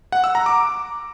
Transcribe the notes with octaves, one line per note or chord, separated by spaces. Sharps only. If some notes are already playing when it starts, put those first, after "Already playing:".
F#5
E6
A#5
D6